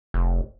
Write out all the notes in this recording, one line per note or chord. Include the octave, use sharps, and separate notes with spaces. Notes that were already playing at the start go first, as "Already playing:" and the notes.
F1